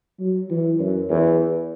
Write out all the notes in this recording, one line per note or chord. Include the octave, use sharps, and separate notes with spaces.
F#3
E3
F#2
E2